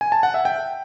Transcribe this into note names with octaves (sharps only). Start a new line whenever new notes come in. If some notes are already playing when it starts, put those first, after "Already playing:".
G#5
A5
F#5
E5
G5